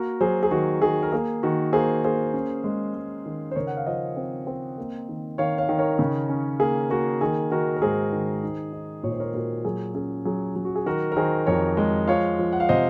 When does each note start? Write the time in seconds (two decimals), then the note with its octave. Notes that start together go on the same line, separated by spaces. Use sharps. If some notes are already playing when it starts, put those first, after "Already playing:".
Already playing: A#3 F#4 A#4
0.21 F#3 G#4 C5
0.43 G#4
0.51 D#3 F#4
0.82 D#3 G#4
1.03 A#4
1.12 A#3 G#4
1.43 D#3 F#4
1.73 A#3 G#4 C5
2.04 A#3 G#4 C5
2.34 C#4
2.64 G#3
2.95 G#3
3.26 D#3
3.51 C5
3.55 C#3 A#4 C#5
3.67 F#5
3.77 F5
3.86 F3 C5 D#5
4.17 C4
4.47 C4
4.78 A#3
5.09 D#3
5.38 D#3 C#5 F5
5.58 C#5 F5
5.69 D#3
5.79 A#4 C#5
5.99 C#3
6.29 C#4
6.60 A#3 G#4
6.90 A#3 F#4
7.21 D#3 G#4
7.51 D#3 F#4 A#4
7.76 A#4
7.82 G#2 G#4 C5
8.12 D#3
8.43 D#4
8.73 D#4
9.04 A#2 C#5
9.12 C5
9.20 A#4 C#5
9.34 A#2 F#4 A#4
9.65 F#3 G#4
9.95 C#4 G#4
10.25 F#3 G#4
10.56 F#3
10.65 F#4
10.76 G#4
10.86 D#3 F#4 A#4
11.12 A#4
11.17 D#3 G#4 C5
11.47 F2 A#4 C#5
11.77 G#3
12.07 F3 C#5 F5
12.39 F3
12.52 F#5
12.60 F5
12.69 C3 C5 D#5